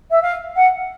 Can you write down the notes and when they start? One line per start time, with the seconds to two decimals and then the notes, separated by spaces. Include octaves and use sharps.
0.10 E5
0.22 F5
0.55 F#5